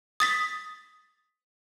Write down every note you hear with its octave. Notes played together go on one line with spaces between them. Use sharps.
D#6 A6 B6